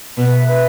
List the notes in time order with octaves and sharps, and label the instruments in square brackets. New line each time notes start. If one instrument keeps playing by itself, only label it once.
[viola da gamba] B2 [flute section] B4
[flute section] E5
B4